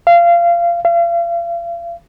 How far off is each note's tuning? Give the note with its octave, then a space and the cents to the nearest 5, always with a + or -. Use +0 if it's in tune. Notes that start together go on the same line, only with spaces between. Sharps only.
F5 -25
F5 -40